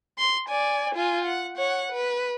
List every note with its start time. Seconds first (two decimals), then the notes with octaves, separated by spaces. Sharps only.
0.18 C6
0.49 D5 G#5
0.95 F4 G#5
1.25 F#5
1.57 C#5 F#5
1.92 B4